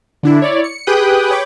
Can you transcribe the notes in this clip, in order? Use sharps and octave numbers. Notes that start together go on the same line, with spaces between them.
D3 D4 E4
E4 C#5 D5
C#7
G4 G#4 B4 G5 D#6 F#6
C#5 G5 B5 D6